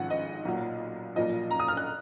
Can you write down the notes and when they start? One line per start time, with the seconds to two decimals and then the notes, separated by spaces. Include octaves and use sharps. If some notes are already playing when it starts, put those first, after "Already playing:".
Already playing: G#1 G#2 F3 F#5
0.10 D#5
0.45 B1 A#2 F#3
1.16 B1 A#2 F3 D#5
1.51 A#5
1.59 D#6
1.68 F6
1.77 F#6